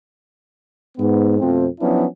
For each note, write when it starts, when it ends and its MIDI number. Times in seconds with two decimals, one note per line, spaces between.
0.97 1.39 44
0.97 1.39 59
1.40 1.67 41
1.40 1.67 47
1.40 1.67 53
1.40 1.67 57
1.40 1.67 60
1.80 2.06 53
1.80 2.06 54
1.80 2.06 59
1.80 2.06 61
1.80 2.06 62
1.80 2.06 64